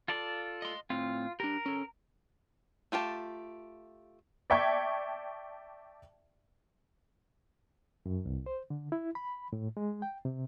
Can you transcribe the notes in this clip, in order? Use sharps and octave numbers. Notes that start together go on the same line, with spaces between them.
F4 A4 D5
D#5 C6
A2 C4 F4
D4 G4 A#4
C#4 A4
A3 F4 G4 A5
D5 E5 G5 A5 C#6 G#6
F#2
C2
C5
D3
E4
B5
A2
G#3
G5
C3